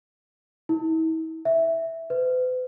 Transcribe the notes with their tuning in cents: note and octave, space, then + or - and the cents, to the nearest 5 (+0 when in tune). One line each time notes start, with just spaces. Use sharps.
E4 -40
E5 +0
B4 +45